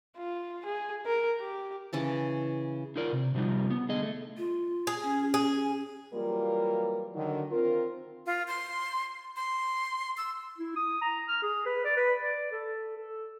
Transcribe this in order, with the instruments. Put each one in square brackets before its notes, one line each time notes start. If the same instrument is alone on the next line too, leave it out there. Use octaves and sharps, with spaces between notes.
[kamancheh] F4
G#4
A#4
G4
[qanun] C#3 E3 C#4 A5
[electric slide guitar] D#4 F4 A#4 D5
C3
C3 F3 G3 D#4
B3
D3 G#4 D#5
A3
[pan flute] F4
[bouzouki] G#4
[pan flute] C#4
[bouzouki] G#4
[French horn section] E3 F#3 G3 A#3 F4 A#4
D3 D#3 F#3
C4 F4 A#4
[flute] F4
C6
C6
E6
[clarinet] E4
D#6
A#5
F6
G#4
B4
D5
B4
D5
A4
A4